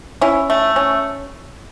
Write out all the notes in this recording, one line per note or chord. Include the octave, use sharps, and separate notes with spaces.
C#4 E4
A3
C#4